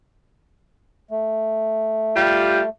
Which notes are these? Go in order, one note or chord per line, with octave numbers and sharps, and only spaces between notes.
A3
G3 F4 G4